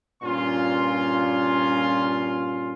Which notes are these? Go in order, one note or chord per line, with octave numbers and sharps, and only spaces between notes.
G2 A#2 C#4 F4 C6